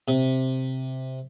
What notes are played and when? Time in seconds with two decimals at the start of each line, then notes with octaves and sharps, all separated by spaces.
0.08 C3